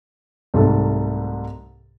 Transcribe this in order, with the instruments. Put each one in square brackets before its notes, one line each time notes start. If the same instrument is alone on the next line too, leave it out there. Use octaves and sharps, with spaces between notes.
[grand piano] C2 G#2 C3 A3 A4